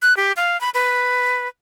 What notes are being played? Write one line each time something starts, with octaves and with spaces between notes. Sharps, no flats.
F#6
G4
F5
B5
B4